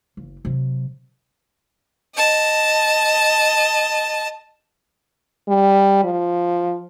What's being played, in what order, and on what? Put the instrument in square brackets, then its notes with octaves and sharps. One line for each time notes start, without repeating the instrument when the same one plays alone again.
[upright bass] F#1
C3 F#3
[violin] D#5 A5
[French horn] G3
F3